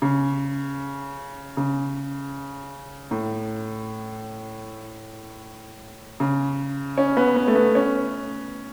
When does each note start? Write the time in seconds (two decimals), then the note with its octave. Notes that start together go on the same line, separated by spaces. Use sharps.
0.02 C#3
1.57 C#3
3.11 A2
6.20 C#3
6.98 C#4
7.17 B3
7.36 B3
7.47 A3
7.55 B3
7.75 C#4